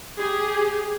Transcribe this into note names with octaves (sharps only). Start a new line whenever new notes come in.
G4 G#4